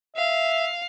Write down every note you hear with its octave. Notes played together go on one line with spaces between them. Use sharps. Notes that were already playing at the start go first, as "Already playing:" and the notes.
E5 F5